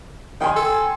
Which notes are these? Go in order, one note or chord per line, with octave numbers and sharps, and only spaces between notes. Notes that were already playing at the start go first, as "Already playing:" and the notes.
D#3 G5 G#5 C6
A4